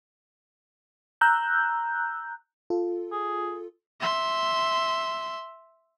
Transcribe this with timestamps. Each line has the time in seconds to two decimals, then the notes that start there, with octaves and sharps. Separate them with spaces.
1.21 A#5 E6 F#6 G6
2.70 F4 A4
3.12 G#4
4.00 E5 C6